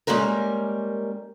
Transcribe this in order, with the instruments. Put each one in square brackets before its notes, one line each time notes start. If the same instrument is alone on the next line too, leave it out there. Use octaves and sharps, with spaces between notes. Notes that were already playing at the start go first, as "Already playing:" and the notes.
[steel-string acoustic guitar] G3 G#3 A#3 C#4 F#4 A#4